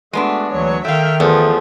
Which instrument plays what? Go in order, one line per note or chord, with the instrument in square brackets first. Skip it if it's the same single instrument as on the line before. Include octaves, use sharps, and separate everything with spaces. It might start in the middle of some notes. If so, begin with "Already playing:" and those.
[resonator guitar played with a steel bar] G#3 B3 D4 [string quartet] A3 F#4
[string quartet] D2 F#3 C#5 [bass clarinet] E3
[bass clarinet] D#3 [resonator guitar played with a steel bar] A3 F5 [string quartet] E5 G5 F6
[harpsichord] E2 [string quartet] E3 F3 A3 [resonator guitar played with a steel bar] A4